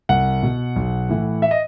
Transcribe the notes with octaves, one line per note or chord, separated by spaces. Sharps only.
C2 F#5
B2
B1
A2 E3
E5
D#5